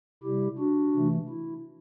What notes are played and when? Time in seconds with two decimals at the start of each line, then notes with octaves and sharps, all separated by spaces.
0.23 C3 G3 E4 G4
0.58 D4 F#4
0.93 C3 E3 A3
1.29 E4